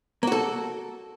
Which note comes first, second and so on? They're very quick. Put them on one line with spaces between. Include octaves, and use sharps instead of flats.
A#3 F#4 A4